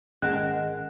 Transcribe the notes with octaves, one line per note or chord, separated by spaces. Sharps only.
G#1 G#3 C#4 A#4 F#5 A5 F#6